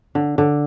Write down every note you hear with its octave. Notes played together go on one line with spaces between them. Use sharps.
D3
D3